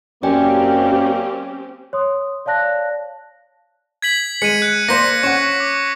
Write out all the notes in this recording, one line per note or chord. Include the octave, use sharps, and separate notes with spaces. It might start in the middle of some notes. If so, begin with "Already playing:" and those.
F#2 A#3 C4 C#4 G4 D5 G5 G#5
C#5 C6 D#6
C#5 D5 F5 A5 F#6 A#6
G#6 B6 F#7
G#3 C#7 D#7
F#6 C#7
A#3 C5 D5 A#6 C#7
C#4 F#5 C#6
D6